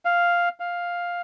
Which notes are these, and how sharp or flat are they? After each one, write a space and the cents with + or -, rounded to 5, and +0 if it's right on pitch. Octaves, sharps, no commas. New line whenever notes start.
F5 +0
F5 +5